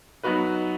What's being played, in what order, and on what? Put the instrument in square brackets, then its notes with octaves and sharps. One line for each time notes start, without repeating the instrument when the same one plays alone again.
[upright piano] F#3 B3 D#4 F#4 B4